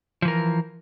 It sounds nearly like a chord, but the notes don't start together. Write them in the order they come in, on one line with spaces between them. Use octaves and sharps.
F3 E3 A#4